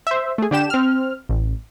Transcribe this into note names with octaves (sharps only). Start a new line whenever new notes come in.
C5 E5
A3 G#4
D3 D4 G4 E7
C4 F6
A1